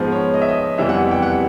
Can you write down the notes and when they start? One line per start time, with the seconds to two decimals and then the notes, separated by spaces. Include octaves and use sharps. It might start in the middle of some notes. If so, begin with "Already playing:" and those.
Already playing: G#2 F3 G#3 B3 C5
0.12 C#5
0.34 D#5
0.41 E5
0.49 D#5
0.78 F2 C3 E3 G3 B3 E5
0.89 F#5
1.11 G5
1.22 F#5